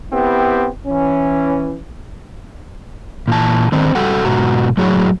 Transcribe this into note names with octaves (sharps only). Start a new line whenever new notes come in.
B3 C4 E4 G4
E3 C#4
A#2 E3 A5
D3 D#3 C4 D4 C5
G3 F#4 A4 F#5 G5
G#2 B2 F#4 A#5
F#2 A2 F#3 F#4 G#4 C#5